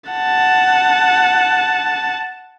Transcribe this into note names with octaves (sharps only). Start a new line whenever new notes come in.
F#5 A5